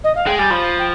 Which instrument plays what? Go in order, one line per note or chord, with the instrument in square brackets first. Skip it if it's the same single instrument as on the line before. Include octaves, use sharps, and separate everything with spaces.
[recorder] D#5
F5
[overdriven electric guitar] G#3 [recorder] G5
[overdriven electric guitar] G3 [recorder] G#5
[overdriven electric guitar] F3 [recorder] B5
[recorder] G5